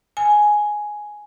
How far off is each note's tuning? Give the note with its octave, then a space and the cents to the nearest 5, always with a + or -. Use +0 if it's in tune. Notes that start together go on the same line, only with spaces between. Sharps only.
G#5 +5